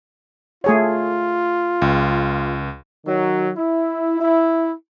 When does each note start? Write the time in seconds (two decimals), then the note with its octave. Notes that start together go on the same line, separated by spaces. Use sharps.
0.64 A3 F4 G#4 C#5
1.82 C#2
3.06 D#3 F#3
3.56 E4
4.20 E4